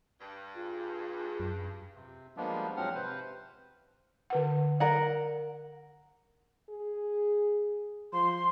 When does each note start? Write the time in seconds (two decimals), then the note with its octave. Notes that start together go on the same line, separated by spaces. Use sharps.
0.20 G2
0.54 F4 G#4
1.40 F#2
1.94 C3
2.37 F3 G3 G#3 A#3 B3 D4
2.77 G#2 F3 F#3 C4 F#5 F6
2.95 C3 B4 C5
4.30 D3 B4 F#5
4.80 A#4 D5 F#5
6.70 G#4
8.13 F3 C6